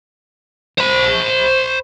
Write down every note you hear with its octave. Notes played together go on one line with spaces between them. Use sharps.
C5 B5